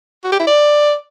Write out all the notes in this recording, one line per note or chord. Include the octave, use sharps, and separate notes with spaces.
F#4
G4
E4
D5